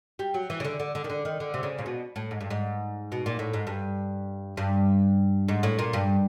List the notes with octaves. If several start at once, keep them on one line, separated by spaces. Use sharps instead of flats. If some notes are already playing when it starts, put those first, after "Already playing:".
G3
F#3
E3
C#3
D3
D3
D3
D#3
D3
D#3
D3
C3
C#3
A#2
B2
A2
G#2
G2
G#2
B2
A#2
A2
G#2
G2
G2
G#2
A2
A#2
G2